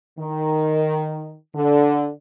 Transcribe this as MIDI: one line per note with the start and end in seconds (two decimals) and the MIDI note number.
0.19 1.34 51
1.56 2.10 50